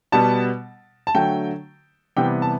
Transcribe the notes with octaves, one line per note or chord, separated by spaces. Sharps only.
B2 G3 B3 A5
A5
D3 F#3 A3 G5
C3 E3 G3 B3 G5
A5